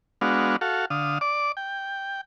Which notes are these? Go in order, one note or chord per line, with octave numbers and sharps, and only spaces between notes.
G#3 B3 D4 F#4 F5
F#4 A4 F5
D3 F5 D#6
D5 D6
G5